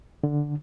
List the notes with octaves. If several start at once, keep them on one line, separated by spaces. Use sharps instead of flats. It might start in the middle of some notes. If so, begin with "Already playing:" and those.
D3